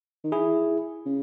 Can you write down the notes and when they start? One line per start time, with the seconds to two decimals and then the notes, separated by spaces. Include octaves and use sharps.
0.24 D#3
0.32 E3 E4 G#4
1.06 C#3